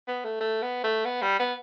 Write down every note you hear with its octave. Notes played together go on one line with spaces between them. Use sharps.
B3
A3
A3
B3
A3
B3
G3
B3